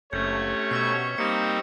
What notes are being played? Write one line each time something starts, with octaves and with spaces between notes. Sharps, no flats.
F#1 C3 A3 C#4 C#5 G6
B2 C#6 E6 B6
G3 A#3 C4 D#4 C#7